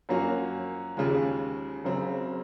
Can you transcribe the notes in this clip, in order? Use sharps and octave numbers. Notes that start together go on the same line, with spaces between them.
F#2 F3 A#3 C#4 F#4
D#2 C#3 F3 G#3
F#1 F#2 C#3 F#3 C4